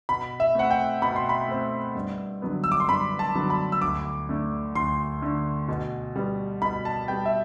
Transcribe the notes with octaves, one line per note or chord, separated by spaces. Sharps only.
B2 B5
E5
A3 C4 F#5
G5
B2 B5
C6
B5
A3 C4
G2
D3 F#3 B3
E6
D6
C6
G2 B5
A5
D3 F#3 B3
B5
E6
D2 D6
D3 A3
D2 C6
D3 A3
B2
G3 B3
B2 B5
A5
G3 B3 G5
E5